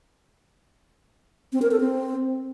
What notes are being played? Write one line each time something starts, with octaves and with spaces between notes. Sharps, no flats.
C4
A#4
A4
C4